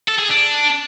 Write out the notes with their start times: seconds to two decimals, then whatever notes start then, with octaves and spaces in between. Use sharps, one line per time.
0.08 A4
0.19 G#4
0.30 D4